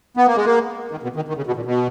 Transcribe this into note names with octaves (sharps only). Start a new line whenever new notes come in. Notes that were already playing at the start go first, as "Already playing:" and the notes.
B3
A#3
G#3
A#3
D#3
B2
D#3
D#3
C#3
B2
A#2
B2